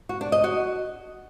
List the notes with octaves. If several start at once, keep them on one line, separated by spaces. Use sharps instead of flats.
F#4
D4
D#5
F#4